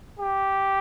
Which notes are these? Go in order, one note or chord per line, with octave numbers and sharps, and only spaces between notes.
G4